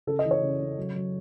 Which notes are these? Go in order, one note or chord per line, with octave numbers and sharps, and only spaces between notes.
C#3 A4
D#5
E3
C#5
C#3
C#3
F#3
F#3